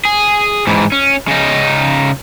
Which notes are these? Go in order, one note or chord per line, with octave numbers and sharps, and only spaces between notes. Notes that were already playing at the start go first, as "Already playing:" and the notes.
G#4
G#2 E3
C#4
C#3 D#4